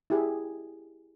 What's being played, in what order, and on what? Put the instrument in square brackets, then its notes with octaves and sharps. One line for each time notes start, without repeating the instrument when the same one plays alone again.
[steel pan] E4 G4 G#4